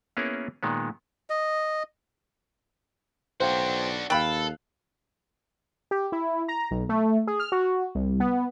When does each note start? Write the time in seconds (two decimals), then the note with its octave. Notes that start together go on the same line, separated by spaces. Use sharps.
0.17 A#3 B3 C#4 E4 G#4 A#4
0.63 A#2 D#3 G#3 B3
1.30 D#5
3.40 B1 D4 F#4 C5 F5 G5
4.10 D#2 A4 F5 G5 B5 F#6
5.91 G4
6.12 E4
6.48 A#5
6.71 B1
6.89 A3
7.27 G#4
7.40 F6
7.52 F#4
7.95 C2
8.20 B3